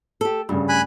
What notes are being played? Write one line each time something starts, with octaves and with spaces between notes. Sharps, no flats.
G4 A4
D2 G2 C#3
G#5 B5 F#6